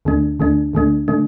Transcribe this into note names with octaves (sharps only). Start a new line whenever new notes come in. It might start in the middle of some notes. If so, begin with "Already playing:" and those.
D2 D3 A3 D4
D2 D3 A3 D4
D2 D3 A3 D4
D3 A3 D4